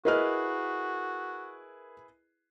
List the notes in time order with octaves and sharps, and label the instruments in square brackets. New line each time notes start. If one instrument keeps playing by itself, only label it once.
[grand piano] E4 G#4 B4 [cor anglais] F#4 [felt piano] A#4 D#5 F6